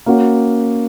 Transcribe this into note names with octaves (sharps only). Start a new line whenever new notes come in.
A#3 C#4 F#4